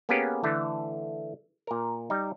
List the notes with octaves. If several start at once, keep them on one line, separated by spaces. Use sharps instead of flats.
A#3 B3 C#4 G4 G#4 B4
D3 E3 A3
A#2 A#4
G3 D#4